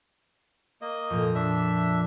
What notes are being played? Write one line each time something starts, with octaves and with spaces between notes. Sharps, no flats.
A#3 D#5
F2 A#2
D4 E5